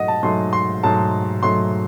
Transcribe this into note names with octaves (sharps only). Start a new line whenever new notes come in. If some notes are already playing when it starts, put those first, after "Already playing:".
Already playing: G#2 F#3 A3 D#5 F#5
A5
G#2 F#3 A3 C6
C6
G#2 F#3 A3 A5
G#2 F#3 A3 C6